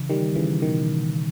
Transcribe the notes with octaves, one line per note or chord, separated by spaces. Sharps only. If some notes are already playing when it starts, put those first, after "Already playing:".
Already playing: C#3 E3
D#3 G3
C#3 E3
B2 D#3